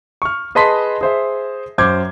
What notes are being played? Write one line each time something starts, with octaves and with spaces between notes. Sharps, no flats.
C#6 F6
G#4 B4 D#5 A5 C6 B6
G#4 C5 E5
F#2 C5 D6 G6 G#6